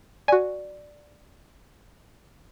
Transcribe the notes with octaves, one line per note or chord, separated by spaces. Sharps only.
F#4 D5 G#5